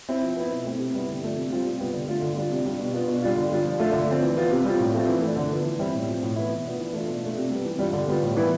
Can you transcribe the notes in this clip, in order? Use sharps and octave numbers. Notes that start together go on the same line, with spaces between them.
C4 E4
F3
B3 E4
B2
A3 C4 E4
C3
G3 B3 E4
D3
F3 A3 D4
C3
G3 C4 F4
C3
G3 B3 F4
D3
A3 D4 F4
D3
G3 D4 F4
C3
G3 D4 F4
B2
B3 D4 F4
B2
G3 D4 F4
D3
G3 D4 F4
F3
A3 D4 F4
D3
F3 C4
E3
B3 F4
C3
G3 C4 F4
A2
F3 A3 C4 F4
E3
A3
D4
D3
F3 B3
E3
G3 C4 E4
A2
F3 C4 F4
A2
E3 B3 E4
B2
B3 D4 F4
E3
A3 D4 F4
B2
A3 D4 F4
C3
G3 B3
E3
G3 D4 F4
D3
G3 B3 F4
A2
E3 G3 B3 E4